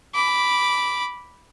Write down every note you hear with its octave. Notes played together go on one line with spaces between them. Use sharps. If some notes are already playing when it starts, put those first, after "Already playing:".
B5 D6